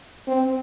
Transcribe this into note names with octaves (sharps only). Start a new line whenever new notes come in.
C4